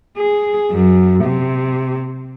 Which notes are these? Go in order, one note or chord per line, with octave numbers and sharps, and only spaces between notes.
G#4
F#2
C3